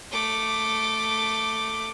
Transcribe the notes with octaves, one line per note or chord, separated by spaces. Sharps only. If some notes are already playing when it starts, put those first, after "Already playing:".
A3 D6